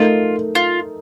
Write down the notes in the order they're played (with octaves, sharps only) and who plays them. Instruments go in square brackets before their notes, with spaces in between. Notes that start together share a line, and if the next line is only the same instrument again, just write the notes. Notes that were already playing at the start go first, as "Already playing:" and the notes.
Already playing: [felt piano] A3 D#4 A#4 [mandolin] F4
[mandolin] F4